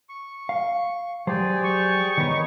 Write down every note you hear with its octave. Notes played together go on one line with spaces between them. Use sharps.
C#6
F5
F#3 G4 G#4 C5 D5
C#6
D#3 B3 D#4 B4 C#5